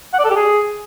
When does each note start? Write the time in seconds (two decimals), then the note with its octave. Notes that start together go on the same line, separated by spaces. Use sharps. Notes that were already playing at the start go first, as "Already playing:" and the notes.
0.13 F#5
0.19 D5
0.25 A4
0.30 G4
0.36 G#4